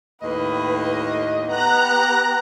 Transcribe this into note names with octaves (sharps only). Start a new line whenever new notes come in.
D#2 A2 B4 D#5
B3 G4 A#5 F#6